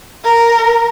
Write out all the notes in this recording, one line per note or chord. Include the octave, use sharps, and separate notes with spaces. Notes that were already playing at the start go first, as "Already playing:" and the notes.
A#4